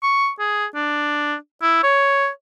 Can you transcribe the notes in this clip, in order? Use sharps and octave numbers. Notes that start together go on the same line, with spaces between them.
C#6
G#4
D4
E4
C#5